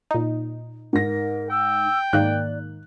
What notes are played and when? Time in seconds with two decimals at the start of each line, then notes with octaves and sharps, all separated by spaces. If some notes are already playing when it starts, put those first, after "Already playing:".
0.11 A#2 D#4
0.93 G#2 A#4 A#6
1.51 G5 E6
2.13 G#2 D#3 A#3 D5 F#6